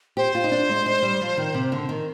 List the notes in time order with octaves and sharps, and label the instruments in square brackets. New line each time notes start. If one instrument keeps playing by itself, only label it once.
[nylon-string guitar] G4 [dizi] C5
[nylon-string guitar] F4
D#4
D4
G#3
G#3
G3
F3
D#3
C3
D3
D#3